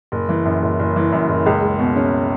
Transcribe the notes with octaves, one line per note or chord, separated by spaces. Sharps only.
F#1
E3
F#2
F#1
F#1
E3
F#2
F#1
C#2
G#3
B2
C#4